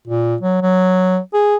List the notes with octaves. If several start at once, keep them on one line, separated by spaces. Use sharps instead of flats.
A#2
F#3
F#3
G#4